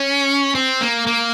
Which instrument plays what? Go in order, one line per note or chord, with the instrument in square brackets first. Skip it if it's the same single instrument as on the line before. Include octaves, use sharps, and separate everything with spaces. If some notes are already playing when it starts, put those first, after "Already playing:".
Already playing: [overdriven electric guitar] C#4
C4
A#3
A#3